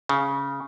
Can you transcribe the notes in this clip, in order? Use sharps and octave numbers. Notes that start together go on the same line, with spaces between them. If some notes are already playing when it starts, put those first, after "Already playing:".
C#3